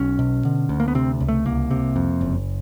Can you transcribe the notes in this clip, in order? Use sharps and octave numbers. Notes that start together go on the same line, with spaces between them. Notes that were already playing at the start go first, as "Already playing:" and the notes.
Already playing: B1 C#4
B2
D3
D2
A#3
B3
C3 C4
C#2
A3
C2 A#3
C3
F2
F#1